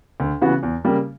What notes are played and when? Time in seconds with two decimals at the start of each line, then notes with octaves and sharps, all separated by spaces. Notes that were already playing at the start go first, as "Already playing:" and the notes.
0.20 D2
0.41 C#3 E3 B3 F#4
0.63 E2
0.85 C#3 G3 A#3